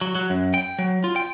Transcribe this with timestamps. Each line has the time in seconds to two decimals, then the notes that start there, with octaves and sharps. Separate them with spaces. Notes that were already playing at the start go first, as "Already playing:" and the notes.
0.01 F#3
0.15 F#3
0.30 F#2
0.54 G5
0.79 F#3
1.04 F4
1.16 G5